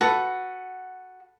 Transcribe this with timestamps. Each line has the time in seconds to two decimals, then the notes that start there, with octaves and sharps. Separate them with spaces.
0.01 F#4 A4 B4 A5